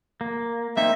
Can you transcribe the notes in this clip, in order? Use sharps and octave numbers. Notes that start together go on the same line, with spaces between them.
A#3
A#3 C4 D#4 E5